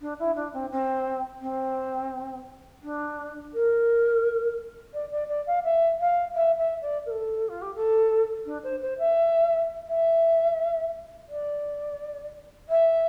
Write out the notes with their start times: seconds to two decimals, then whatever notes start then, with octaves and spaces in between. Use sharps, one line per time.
0.01 D4
0.19 E4
0.35 D4
0.53 C4
0.71 C4
1.41 C4
2.82 D4
3.53 A#4
4.93 D5
5.11 D5
5.29 D5
5.47 F5
5.64 E5
5.99 F5
6.35 E5
6.58 E5
6.81 D5
7.06 A#4
7.10 A4
7.49 F4
7.61 G4
7.75 A4
8.45 D4
8.63 C5
8.81 C5
8.98 E5
9.87 E5
11.28 D5
12.69 E5